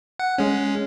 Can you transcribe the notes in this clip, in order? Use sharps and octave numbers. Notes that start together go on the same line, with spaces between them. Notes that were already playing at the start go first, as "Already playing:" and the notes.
F#5
G#3 C#4